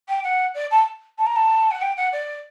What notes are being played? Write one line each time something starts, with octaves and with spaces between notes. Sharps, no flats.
G5
F#5
D5
A5
A5
A#5
A5
F#5
G5
F#5
D5